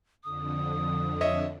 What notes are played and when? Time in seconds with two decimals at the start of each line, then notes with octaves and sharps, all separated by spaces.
0.24 F2 D3 D#6
1.21 C#5 D#5 E5